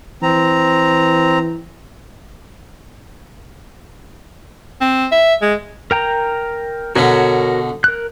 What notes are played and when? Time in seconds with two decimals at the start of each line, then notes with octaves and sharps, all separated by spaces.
0.22 E3 C4 A#5
4.81 C4
5.12 E5
5.42 G#3
5.91 A#4 G5 A#5
6.96 B2 D3 F#4 A#4 C#5
7.84 A#4 F#6